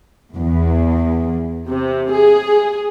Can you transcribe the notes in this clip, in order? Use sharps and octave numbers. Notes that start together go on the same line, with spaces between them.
E2
C3
G#4